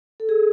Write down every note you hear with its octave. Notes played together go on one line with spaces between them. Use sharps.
A4
G#4